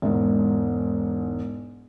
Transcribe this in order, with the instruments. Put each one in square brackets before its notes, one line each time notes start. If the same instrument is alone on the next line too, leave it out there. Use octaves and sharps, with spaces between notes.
[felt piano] E1 G#2